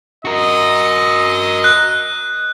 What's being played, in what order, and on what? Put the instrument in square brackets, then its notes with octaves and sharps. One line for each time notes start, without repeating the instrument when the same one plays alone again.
[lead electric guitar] F#4 A#4 [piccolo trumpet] D#5
[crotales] F#6